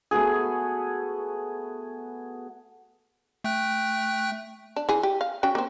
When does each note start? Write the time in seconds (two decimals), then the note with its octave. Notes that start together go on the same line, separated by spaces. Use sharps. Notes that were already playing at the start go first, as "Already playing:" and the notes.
0.11 A3 B3 F#4 G#4
3.44 A3 G5 F#6
4.76 D4
4.89 E3 G#4
5.03 G4
5.21 F5
5.43 C#4 F#4 G5
5.55 A#3 C4